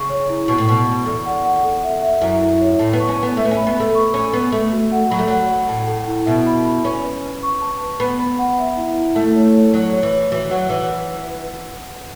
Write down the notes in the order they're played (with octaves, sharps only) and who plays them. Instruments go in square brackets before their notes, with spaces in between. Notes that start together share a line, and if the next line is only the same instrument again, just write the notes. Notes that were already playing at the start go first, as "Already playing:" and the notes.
Already playing: [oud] C#3 [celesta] C#6
[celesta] C#5
E4
[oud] B2 [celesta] C#6
[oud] A2
[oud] B2 [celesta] C#6
[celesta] C#6
[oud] E2 [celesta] A4
[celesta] F#5
F#5
A4
E5
E5
[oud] F#2 [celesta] E4
[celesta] E4
C#5
[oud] A2 [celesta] A5
[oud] B3
[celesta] C#6
[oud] C#4
[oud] B3 [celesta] B4
[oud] A3 [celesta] E5
[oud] B3
C#4
[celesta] B5
[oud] B3
[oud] A3 [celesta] B5
[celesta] C#6
[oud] C#4 [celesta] C#6
[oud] B3 [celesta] B4
[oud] A3 [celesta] A4
[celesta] F#4
F#5
[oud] F#3 [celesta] B5
[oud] A3
[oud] F#3 [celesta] F#5
[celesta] F#5
[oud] A2 [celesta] A5
[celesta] A4
E4
[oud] B2 [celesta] E5
[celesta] B5
B5
[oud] C#4 [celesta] B4
[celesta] B4
B4
C#6
A5
B4
[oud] B3 [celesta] B5
[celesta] B5
F#5
E5
E4
E4
[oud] A3 [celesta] A5
[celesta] C#5
C#5
[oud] F#3 [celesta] C#5
[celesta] C#5
[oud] E3
[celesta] C#5
[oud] E3 [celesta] F#4
[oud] F#3 [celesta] F#5
[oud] E3 [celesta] F#5
[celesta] B4